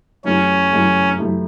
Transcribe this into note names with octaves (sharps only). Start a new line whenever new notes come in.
F#2 E3 A3 C#4 E4 G4
F#2 E3 A3 E4 G4
F#2 E3 A3 E4 G4